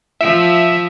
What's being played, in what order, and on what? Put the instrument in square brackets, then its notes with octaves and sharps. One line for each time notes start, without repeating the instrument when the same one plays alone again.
[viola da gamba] F3 [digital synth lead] E5